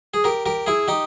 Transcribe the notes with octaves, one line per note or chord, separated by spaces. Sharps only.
G#4
G4 A#4
G4 A#4
E4 G#4
D#4 G4